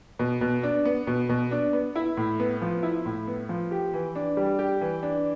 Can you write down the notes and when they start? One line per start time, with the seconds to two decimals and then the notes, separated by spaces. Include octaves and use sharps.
0.19 B2
0.41 B2
0.63 D4
0.85 B3
1.07 B2
1.29 B2
1.51 D4
1.73 B3
1.96 E4
2.17 A2
2.40 B3
2.61 F3
2.83 E4
3.06 A2
3.27 B3
3.49 F3
3.71 G4
3.94 E3
4.15 D4
4.37 G3
4.59 G4
4.81 E3
5.03 D4